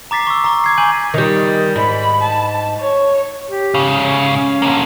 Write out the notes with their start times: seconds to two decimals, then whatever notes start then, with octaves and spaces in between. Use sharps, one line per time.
0.11 A#5 D6 A6 B6 C7
0.27 C#6 E6
0.44 A#5 C#6
0.64 D6 G#6 C7
0.78 G#5 C#6 G6 D#7 F#7
1.14 D#3 G3
1.76 G#2 B5
2.21 A5
2.80 C#5
3.50 G4
3.74 G#2 C#3
4.03 C#4
4.62 D3 A#3